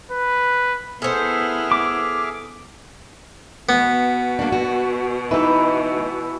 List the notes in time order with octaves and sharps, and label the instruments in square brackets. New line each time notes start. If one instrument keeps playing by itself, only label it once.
[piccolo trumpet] B4
[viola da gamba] B3 E4 [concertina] G#4 E5 F6 [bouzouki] A4 C5
[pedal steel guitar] D6
[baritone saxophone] B2 [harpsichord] B3
[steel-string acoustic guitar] A#3 D4
F#4
[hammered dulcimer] E3 E5 [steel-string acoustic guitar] D#4 B4